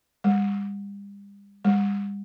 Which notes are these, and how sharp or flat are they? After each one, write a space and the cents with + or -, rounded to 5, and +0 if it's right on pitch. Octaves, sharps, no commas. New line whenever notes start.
G3 +40
G3 +40